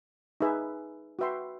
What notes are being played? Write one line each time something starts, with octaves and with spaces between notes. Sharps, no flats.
D#4 G#4 B4 E5
F#4 B4 E5 G5 C6